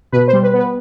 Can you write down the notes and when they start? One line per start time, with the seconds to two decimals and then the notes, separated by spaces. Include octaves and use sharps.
0.12 B2 B4
0.28 C5
0.33 G3
0.43 B4
0.53 B3
0.59 B4